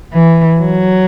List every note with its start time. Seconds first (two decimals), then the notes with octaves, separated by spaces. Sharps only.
0.14 E3
0.60 F#3